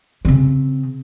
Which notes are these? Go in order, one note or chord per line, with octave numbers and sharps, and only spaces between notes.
C#3 C4